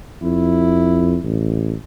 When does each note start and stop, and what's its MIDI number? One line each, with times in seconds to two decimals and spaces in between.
0.23 1.18 41
0.23 1.29 64
1.24 1.74 33